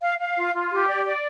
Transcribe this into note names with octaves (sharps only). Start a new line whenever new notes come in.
F5
F5
F4
F4
G4
D5
D5